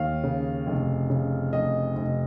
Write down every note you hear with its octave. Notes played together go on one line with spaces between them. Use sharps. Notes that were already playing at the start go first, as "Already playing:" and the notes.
Already playing: D#2 F5
C#3
F1
C#3
F1 D#5
F1